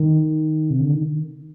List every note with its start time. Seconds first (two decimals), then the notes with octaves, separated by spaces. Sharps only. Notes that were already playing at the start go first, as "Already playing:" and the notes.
Already playing: D#3
0.70 C3
0.81 D3
0.93 D#3